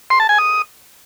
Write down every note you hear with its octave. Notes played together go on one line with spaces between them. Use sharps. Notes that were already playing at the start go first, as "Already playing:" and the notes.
C6
A5
G#5
D#6